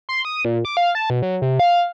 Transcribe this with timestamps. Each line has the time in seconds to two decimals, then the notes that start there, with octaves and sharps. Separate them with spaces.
0.09 C6
0.25 D#6
0.45 A#2
0.65 D6
0.77 F5
0.95 A5
1.10 B2
1.22 F#3
1.42 C3
1.59 F5